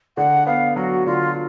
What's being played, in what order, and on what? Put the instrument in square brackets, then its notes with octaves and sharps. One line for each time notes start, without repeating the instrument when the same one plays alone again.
[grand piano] D3 [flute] F#5
[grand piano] B3 [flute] F5
[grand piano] F#3 [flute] F#4
[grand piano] D3 [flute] F4